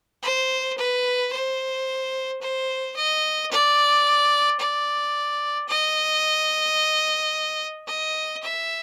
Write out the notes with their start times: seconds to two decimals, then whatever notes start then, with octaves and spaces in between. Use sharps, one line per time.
0.23 C5
0.78 B4
1.33 C5
2.41 C5
2.96 D#5
3.51 D5
4.60 D5
5.68 D#5
7.87 D#5
8.42 E5